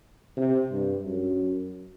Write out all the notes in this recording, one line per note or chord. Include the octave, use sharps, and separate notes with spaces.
C3
G2
F#2